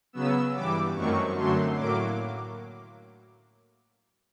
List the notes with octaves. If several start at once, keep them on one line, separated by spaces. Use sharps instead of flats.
C#3 F#3 B3 E6
G2 E3 G3 D6
F#2 D#3 F#3 A3 C4 C#6
F#2 D3 F#3 A3 C6
A2 F#3 A#3 D6